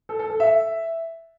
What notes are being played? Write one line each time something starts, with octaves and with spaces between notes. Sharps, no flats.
A4
A4
A4
E5